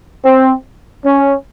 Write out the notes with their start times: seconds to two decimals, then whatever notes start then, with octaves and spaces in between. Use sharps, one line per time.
0.25 C4
1.05 C#4